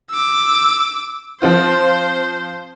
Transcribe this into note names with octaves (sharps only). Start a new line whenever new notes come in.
D6 E6
F3 C4 F4 C5